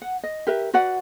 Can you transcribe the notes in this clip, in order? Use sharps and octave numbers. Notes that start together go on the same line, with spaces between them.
F#5
D#5
G4 A#4 B4 E5
F#4 B4 D5 F#5